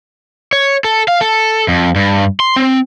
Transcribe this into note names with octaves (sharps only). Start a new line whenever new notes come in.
C#5
A4
F5
A4
F2
G2
C6
C4